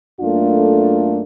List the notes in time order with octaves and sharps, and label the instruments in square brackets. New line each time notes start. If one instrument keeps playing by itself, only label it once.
[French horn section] F#2 A3 A#3 D4 F4 A4